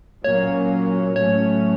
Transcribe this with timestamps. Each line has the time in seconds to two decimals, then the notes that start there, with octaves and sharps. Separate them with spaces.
0.24 A#2 F#3 A#3 C#4 C#5
1.16 A2 F#3 A3 C#4 C#5